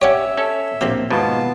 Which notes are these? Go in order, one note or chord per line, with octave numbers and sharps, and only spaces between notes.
C#4 G4 C#5 D5 E5 F#5
C#4 A4
A#1 F3 A#3 C4 G4
D#2 G#2 B2 B3 F4 A5